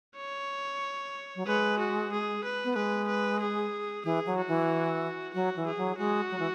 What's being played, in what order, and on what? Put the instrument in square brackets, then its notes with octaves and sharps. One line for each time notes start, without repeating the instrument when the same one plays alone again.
[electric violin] C#5
[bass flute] F#3
[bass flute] G#3 [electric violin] B4
[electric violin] F#4
G#4
B4
[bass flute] B3
[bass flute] G#3 [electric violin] B4
[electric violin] B4
G#4
[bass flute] E3 [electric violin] G#4
[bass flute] F#3
[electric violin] F#4
[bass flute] E3
[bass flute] F#3 [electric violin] F#4
[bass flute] E3
[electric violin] G#4
[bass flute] F#3
[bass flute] G#3 [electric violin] F#4
[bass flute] F#3
E3